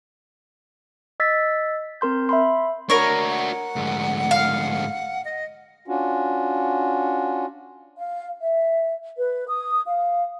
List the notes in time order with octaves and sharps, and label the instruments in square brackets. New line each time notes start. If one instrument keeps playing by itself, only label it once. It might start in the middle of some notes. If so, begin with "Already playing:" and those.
[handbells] D#5 E6 A6 B6
C4 A#4 C6 G6
E5 B5 C6
[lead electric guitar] D4 F#4 [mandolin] A#4 C#5
[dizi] F#5
[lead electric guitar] D2 G#2
[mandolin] F5
[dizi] D#5
[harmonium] C#4 D4 F4 F#4
[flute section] F5
E5
B4
D#6
F5